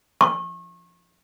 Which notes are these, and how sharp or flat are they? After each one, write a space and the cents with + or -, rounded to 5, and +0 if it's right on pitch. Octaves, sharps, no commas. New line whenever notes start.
C#6 -35